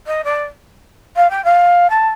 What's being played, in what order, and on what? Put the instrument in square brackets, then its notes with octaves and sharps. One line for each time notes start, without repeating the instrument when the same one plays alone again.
[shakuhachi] D#5
D5
F5
G5
F5
A5